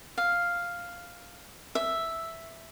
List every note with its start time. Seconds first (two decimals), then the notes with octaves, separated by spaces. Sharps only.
0.18 F5
1.75 E5